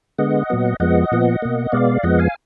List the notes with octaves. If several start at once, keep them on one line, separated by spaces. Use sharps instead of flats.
D3 G#3 B3 D#5 F#5
A#2 F#3 B3
F2 F3 G#3 B3 D#5 F#5
A#2 F3 B3
B2 A#3
B2 G#3 B3 D5 F5
F2 F3 G#3 B3 D#5 F#5
F5 G#5